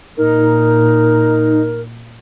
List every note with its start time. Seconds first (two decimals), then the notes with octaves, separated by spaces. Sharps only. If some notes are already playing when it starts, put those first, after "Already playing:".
0.18 A#2 D#4 A#4